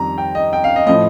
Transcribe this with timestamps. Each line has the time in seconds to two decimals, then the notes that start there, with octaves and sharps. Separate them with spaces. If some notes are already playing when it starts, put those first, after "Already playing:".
Already playing: F2 D#3 G3 A#5
0.18 G5
0.35 D#5
0.53 G5
0.64 F5
0.76 D#5
0.87 A2 F3 D#5